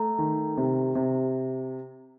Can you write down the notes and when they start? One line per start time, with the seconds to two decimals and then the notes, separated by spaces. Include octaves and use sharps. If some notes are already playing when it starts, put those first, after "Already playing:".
Already playing: A3 A#5
0.19 D#3
0.57 C3
0.95 C3